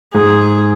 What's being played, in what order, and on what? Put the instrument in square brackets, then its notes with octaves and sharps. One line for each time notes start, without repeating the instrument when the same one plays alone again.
[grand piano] G#2 [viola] G#4